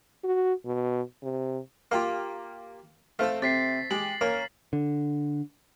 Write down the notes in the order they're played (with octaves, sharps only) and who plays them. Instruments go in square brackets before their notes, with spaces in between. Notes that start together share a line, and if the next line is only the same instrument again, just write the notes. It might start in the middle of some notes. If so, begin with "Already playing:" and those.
[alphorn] F#4
B2
C3
[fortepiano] A#3 [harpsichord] F4 G4 F5
[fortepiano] A3 C4 [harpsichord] A4 F5
[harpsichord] C3 [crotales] A6 B6 C7
[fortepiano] G#3 [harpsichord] G4 [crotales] F#7
[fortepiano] A#3 [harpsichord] C#4 A#4
[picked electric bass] D3